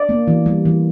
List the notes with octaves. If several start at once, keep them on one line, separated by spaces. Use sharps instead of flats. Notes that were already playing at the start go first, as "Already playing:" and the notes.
Already playing: D5
A#3
E3
G3
E3